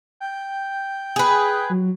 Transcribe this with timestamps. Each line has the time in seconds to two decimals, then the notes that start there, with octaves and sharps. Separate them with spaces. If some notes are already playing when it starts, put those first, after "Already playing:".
0.20 G5
1.16 G#4 B4
1.70 F#3